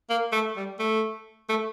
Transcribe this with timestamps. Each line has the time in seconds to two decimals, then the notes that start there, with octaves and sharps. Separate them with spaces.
0.10 A#3
0.33 A3
0.57 G3
0.80 A3
1.50 A3